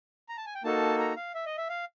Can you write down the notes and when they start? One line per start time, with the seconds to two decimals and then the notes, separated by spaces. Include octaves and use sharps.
0.29 A#5
0.37 A5
0.46 G#5
0.55 G5
0.64 A#3 D#4 F#4 A4 A5
0.99 A#5
1.16 F5
1.34 E5
1.46 D#5
1.57 E5
1.69 F5